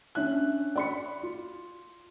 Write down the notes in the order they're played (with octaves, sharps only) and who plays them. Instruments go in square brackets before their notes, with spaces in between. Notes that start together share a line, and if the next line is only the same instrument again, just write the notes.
[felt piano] C#4 D4 E5 F#6
D5 B5 C#7
F4